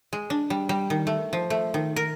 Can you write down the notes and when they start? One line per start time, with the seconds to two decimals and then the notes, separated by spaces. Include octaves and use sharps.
0.13 G#3
0.30 D4
0.50 G3
0.69 G3
0.90 D#3
1.07 A3
1.33 F3
1.50 A3
1.74 D#3
1.96 A#4